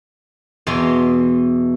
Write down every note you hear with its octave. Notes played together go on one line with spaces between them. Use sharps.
E2 B2 C6